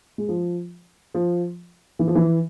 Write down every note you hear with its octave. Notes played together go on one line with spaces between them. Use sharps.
G#3
F3
F3
E3
F3
E3